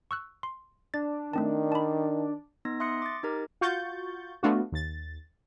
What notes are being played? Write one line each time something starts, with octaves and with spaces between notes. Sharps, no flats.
C#6 E6 F#6
C6
D4 A6
D#3 A3 C4 A5
A5 B5
B3 D#4 A#6
E5 C6 D#6 F#6 A#6 C#7
D6 A6
D#4 G4 A#4 A#5
F4 F#4 C#6 G6 A6
A3 B3 D4 F4 F#4
D#2 A6